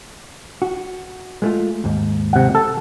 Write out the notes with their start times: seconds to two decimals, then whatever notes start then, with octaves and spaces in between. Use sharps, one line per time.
0.62 F#4
1.42 G#3 A3 F4
1.84 D#2 G#2
2.33 C3 F#5
2.55 A4